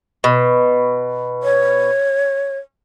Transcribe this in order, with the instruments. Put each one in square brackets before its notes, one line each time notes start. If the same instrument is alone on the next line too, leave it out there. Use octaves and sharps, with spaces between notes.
[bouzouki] B2
[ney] C#5